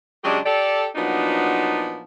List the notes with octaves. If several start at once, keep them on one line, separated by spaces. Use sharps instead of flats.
C#3 F#3 G#3 D4 G4 G#4
G4 A4 D5
A#2 F3 F#3 B3 D4 D#4